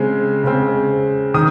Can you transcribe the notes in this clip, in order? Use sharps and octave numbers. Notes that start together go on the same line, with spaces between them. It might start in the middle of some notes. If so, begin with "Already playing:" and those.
Already playing: C#3 G#3 C4
C#3 G#3 C4
D#3 D#6